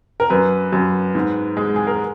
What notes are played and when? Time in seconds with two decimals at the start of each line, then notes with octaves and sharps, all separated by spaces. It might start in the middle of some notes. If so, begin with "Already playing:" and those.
0.20 A#4
0.30 F#2 B4
0.72 F#2
1.15 G#2
1.57 G#3
1.76 G#4
1.87 A#4